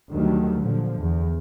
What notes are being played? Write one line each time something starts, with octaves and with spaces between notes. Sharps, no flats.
D2 D#3 F#3 G3
A#2 D3 F3
E2